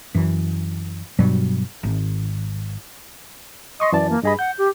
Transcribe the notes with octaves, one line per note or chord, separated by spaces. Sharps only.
F#2 E3
G2 B2 F#3 G3
G#1
D#5 C6 C#6 D#6
F#2 E3 D5 A5
A#3
G2 G#4 D#5 B5
F#5 G6
G4